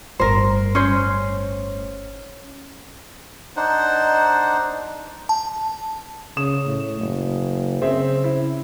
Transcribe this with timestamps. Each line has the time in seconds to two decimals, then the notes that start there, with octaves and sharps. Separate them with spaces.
0.20 G1 A2 A#4 C5
0.75 C#4 C5
3.57 D4 D#4 C5 F#5
5.29 A5
6.37 C#3 C#5 D#6 E7
6.66 A2
7.00 F#1
7.82 C#3 C4 G#4 E5
8.24 E4